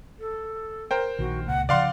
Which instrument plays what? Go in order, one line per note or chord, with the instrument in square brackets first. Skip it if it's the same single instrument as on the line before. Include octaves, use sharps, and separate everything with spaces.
[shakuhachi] A4
[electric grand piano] A#4 C5 G5
[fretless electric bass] A#1 D#3 [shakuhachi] F#4
[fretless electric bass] C#2 A#2 [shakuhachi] F#5
[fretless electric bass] C#3 F3 [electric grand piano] D5 F5 C6 [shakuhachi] F#5